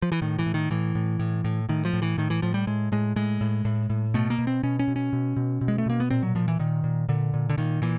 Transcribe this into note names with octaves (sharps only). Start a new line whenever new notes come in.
F3
E3
A2 D#3
E3
A2
D#3
A2 E3
A2
A2
A2
A2 D#3
F3
A2
E3
A2 D#3
E3
A2 F3
G3
A2 G#3
A2 G#3
A2 G#3
A2
A2
A2
B2 A3
A#3
B2
C4
B2 C#4
C#4
B2
C#4
B2
B2
B2
G#3
A3
B2 A#3
B3
A#2 C4
F#3
A#2 F3
E3
A#2 D#3
A#2
A#2 D3
A#2
D3
A#2 D#3
A#2 E3